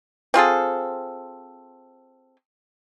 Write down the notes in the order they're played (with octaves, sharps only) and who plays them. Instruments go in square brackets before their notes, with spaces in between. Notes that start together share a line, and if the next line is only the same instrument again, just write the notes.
[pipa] C4 F4 G#4 A4